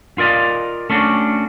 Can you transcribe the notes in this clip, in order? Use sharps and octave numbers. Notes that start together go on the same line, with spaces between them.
F4 A#4 D5 D#5 F5
A3 C#4 D4 F#4